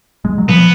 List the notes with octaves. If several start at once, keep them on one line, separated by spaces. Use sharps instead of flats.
G#3
F#3
F3 B3